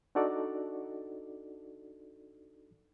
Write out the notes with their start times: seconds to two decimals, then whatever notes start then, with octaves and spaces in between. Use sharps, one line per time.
0.15 D4 D#4 F#4 A4 D5